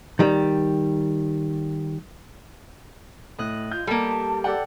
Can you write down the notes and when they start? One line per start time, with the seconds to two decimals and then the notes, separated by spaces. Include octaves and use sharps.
0.19 D#3 G3
3.39 A2 D#5 F#6
3.71 F4 G6
3.87 G3 A#3 A4 A5
4.44 G4 A4 D5 F#5 G5